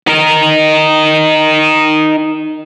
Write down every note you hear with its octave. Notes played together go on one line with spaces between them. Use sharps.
D#4 A#4